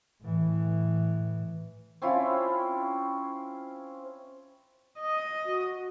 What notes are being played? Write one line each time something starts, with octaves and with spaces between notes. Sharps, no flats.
A2 E3
C4 C#4 E4 F4
D#5
F#4